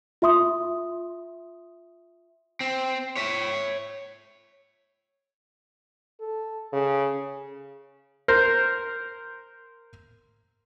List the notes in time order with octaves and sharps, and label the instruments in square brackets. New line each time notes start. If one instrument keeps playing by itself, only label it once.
[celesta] F4 E5 C6 D#6
[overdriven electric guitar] C4
C#5 E5
[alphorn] A4
C#3
[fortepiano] A#4 C5